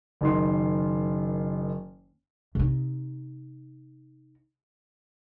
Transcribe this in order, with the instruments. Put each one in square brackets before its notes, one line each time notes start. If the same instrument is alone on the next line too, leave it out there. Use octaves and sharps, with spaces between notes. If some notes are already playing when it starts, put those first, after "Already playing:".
[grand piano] F#1 D#3 C6
[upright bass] C3 D#4